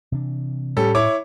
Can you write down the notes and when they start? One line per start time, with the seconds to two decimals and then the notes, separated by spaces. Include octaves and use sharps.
0.12 C3 E3 D4
0.77 A2 G3 C#4 A4
0.95 E4 C#5 D6